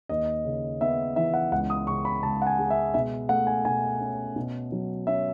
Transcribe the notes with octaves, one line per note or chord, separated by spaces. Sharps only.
D#2 D#5
C#3
B3 E5
E3 E5
F#5
C#2 F#5
D#6
C#3 C#6
B5
C#2 A5
F#5
G#5
G#3
E5
B2 E5
A3 F#5
G#5
B2 G#5
C#4
B2
F#3
C#4 E5